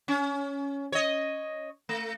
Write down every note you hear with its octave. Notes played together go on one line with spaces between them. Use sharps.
C#4
C#5 D#5
A3